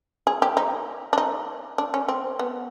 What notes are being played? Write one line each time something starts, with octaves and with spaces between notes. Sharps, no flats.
G#4
G4
D#4
D4
D#4
D4
C#4
C4
B3